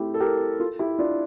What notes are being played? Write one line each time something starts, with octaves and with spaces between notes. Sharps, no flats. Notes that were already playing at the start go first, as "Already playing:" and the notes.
Already playing: A3 C4 E4 G4
A4
G4 A#4
F4 A4
E4 G4
D4 F4